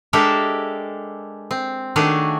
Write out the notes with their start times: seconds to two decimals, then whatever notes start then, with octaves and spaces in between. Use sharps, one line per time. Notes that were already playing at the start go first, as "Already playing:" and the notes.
0.13 G#3 D4 G4 A4 A#4 E5
1.51 C4
1.96 D#3 A3 D4 F#4 G#4 C#5